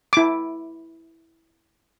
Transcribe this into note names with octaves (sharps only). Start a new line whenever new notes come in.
E4 D6